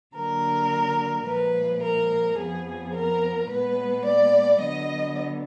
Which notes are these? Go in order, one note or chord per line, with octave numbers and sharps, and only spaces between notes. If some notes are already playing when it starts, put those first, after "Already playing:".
D3 F#3 A#3 A#4
A#2 F3 G#3 B4
A#4
F2 F3 B3 G#4
A#4
A#2 G#3 B3 B4
D5
D3 F#3 B3 D#5